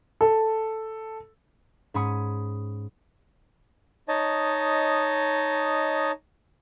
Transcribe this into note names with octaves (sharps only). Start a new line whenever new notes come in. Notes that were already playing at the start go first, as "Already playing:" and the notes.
A4
G#2 C#4 G#5 B5 D#6 C#7
D#4 C#5 D#5 A5